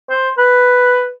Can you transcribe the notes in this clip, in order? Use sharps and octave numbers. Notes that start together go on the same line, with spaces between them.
C5
B4